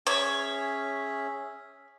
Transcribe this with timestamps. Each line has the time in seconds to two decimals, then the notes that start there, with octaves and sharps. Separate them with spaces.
0.07 C#4 G#4 C#5 E5